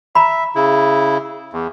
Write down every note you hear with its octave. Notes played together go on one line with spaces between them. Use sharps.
E5 A#5 B5
C#3 E4
E2